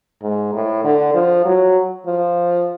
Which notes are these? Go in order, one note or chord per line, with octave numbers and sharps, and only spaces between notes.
G#2
A2
D3
F3
F#3
F3